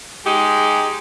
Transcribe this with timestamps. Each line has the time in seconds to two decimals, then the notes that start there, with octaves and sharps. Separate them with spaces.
0.25 G#3 D#4 G4